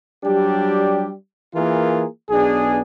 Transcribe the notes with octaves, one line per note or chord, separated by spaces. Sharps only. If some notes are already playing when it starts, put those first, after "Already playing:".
F#3 G3 D4 G4
E3 A#3 F4 G#4 A#4
B1 B3 D4 G#4